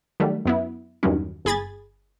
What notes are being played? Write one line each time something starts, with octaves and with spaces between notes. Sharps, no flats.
D#3 F#3 G3 A3
F#2 B3 E4
E2 G2 D#3 F#3 G3 C#4
G1 G#4 B5 G#6 A6